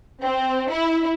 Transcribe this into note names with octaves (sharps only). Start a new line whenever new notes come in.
C4
E4